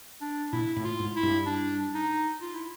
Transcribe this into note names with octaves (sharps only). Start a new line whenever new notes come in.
D4
A#2 E4
A2
F4
G#2
E4
G2
D4
D#4
F4
E4